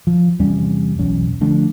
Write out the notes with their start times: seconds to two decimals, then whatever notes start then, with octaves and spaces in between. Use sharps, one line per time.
0.07 F3
0.39 E2 C3 G3 C#4
0.99 B1 E2 C#4
1.41 D3 F3 A3 D4